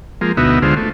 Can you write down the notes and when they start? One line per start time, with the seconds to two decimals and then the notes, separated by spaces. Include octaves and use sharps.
0.21 F3 G#3 A#3
0.37 D2 B2 B3 D#4 F#4 E5
0.62 D2 D3 G#3 F4 C5
0.77 A3